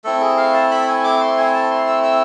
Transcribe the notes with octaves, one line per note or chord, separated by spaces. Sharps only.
A3 C4 E4 A4
G#4
F5
A5
B5
G#5
D6
C6
G#5
A5
C6
E6
E6